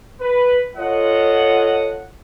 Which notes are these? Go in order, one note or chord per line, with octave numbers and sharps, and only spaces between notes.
B4
F4 A4 C#5 D#5 F#5